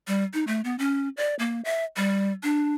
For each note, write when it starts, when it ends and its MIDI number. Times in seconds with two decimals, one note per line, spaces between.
0.07 0.24 55
0.34 0.45 63
0.47 0.61 57
0.64 0.76 59
0.79 1.09 61
1.17 1.35 74
1.39 1.61 58
1.65 1.84 76
1.96 2.33 55
2.43 2.76 62